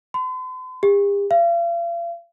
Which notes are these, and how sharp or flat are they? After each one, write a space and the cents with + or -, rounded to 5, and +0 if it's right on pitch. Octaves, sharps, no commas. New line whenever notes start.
C6 -45
G4 +45
F5 -40